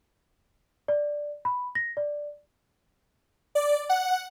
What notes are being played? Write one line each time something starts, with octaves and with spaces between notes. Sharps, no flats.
D5
B5
A#6
D5
D5
F#5